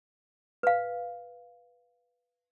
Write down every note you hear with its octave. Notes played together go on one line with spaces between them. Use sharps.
B4 F5